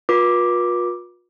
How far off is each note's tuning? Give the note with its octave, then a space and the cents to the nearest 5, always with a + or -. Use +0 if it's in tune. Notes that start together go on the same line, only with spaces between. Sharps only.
F4 +40 B4 -40 D6 +0